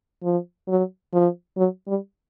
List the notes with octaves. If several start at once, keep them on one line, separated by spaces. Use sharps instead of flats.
F3
F#3
F3
F#3
G3